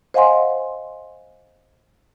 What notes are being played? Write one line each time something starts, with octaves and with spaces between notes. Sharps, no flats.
C5 D#5 F5 F#5 G#5 C6